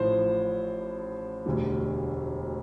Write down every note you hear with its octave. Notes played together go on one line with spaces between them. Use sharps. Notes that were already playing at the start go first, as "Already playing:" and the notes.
Already playing: A1 A2 F3 C5
E1 D2 D3 G3